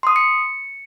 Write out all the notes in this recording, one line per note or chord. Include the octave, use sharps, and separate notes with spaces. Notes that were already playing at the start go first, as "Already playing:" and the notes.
C6 D#6
C#7